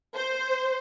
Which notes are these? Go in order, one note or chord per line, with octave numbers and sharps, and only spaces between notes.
C5